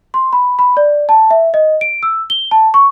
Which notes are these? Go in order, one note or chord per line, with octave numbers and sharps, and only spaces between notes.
C6
B5
B5
D5
A5
E5
D#5
D7
E6
G7
A5
C#6